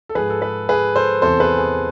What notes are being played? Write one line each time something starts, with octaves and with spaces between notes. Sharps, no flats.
A4
G#2 F3 G#4 B4
A4
G#4 B4
G#4 B4
A4 C5
E2 C3 E3 A4 C5
G#4 B4
G#4